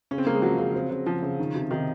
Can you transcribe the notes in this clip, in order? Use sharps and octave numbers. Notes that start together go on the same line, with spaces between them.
C#3 C#4
C4
C#3 A#3
G#3
F3 F#3
C#3
C4
C#3
C#3 F3
C#3
D#3
C3
C3 D#3